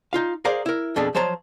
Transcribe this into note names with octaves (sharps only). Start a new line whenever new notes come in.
D#4 F4 F5
G#4 A#4 C5 D5 F5 A#5
E4 A#4
F2 B2 D4 G#4 A4
F3 F#3 C5 C#5 A5 A#5